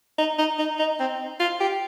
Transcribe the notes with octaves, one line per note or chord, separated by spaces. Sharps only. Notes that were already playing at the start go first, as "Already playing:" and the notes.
D#4
D#4
D#4
D#4
C4
F4
G4